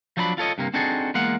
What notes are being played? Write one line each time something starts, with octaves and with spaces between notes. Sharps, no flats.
F3 F#3 D4 A5 B5
F4 A4 C#5 D#5
G2 C3 A#3
C4 D4 D#4 F#4 G#4 A4
E2 G#3 A#3 F5 F#5